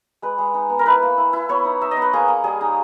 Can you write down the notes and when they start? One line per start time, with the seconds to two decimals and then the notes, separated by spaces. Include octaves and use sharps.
0.22 G#3 B4
0.38 G#3
0.54 D#4
0.70 B3
0.79 A#4
0.86 E4 B4
1.03 A#3
1.18 E4
1.33 E4
1.49 B3 C#5
1.65 D#4
1.81 D#4 E5
1.91 D#5
1.97 B3
2.02 B4
2.13 A#3 G#4
2.28 A#3
2.44 G3 G#4
2.61 D#4